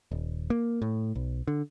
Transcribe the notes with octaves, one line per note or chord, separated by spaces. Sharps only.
D#1
A#3
A2
B1
D3